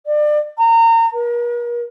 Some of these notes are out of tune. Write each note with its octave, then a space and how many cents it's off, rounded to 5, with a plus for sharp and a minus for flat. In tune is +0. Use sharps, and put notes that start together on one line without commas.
D5 +30
A#5 -30
A#4 +40